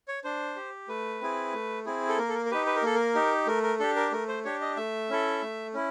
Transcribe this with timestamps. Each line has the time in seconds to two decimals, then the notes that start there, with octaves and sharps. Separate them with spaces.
0.08 C#5
0.24 D4 C5
0.56 G4
0.88 A3 B4
1.21 C4 E4 G#4
1.53 A3
1.85 C4 E4 G#4
2.09 A4
2.18 A#3 A#4
2.29 A4
2.35 A#4
2.46 A#4
2.51 D#4 G4 B4
2.66 B4
2.76 A#4
2.83 A#3 A4
2.95 A#4
3.15 D#4 G4
3.47 A3 A#4
3.63 A#4
3.79 D4 G4 A4
3.96 A#4
4.12 A3 A#4
4.28 C5
4.44 D4 G4 C#5
4.61 D#5
4.77 A3 E5
5.10 C#4 E4 A4
5.42 A3
5.74 C#4 E4